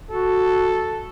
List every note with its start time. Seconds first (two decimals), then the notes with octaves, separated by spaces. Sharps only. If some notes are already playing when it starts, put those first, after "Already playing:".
0.11 F#4 A4